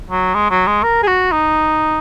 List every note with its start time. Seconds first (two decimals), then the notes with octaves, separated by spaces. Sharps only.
0.10 F#3
0.34 G#3
0.51 F#3
0.67 G#3
0.83 A#4
1.03 G#4
1.07 F#4
1.32 D#4